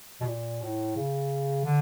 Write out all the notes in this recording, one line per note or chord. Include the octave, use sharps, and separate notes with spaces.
B2
A#2
A2
C#3
D3